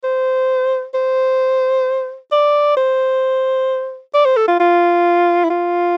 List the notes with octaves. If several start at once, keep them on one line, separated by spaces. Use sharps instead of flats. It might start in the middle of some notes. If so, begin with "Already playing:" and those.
C5
C5
D5
C5
D5
C5
A4
F4
F4
E4
F4